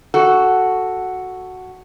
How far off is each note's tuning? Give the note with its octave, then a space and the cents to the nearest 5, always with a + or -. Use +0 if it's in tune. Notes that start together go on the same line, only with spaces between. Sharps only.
F#4 +0 A4 +0